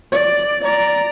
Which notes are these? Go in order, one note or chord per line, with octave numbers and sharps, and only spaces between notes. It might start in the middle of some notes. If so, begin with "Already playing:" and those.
D5
D5 A#5